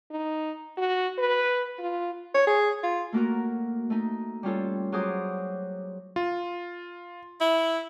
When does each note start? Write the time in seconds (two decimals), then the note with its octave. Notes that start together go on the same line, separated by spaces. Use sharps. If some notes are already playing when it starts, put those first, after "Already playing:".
0.11 D#4
0.78 F#4
1.18 B4
1.79 F4
2.34 C#5
2.47 G#4
2.83 F4
3.13 A3 A#3 F#4 A#4
3.90 A3 D#4
4.43 G3 C#4 F4 A4
4.92 F#3 G#4 C5 D6 D#6
6.16 F4
7.41 E4